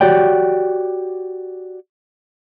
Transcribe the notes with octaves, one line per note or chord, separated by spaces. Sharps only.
F#4 G4 C#5 D5 G5